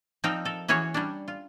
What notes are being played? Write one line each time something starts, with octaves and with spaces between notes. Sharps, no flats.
F3 C4 D#4 D5 F5 G5
A4 A#4
E3 C#4 F#4 G#4 C#5
G3 C#4 D4
F4